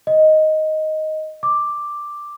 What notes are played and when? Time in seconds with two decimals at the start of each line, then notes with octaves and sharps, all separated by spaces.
0.07 D#5
1.43 D6